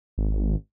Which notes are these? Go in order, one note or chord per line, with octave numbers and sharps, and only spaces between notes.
G#1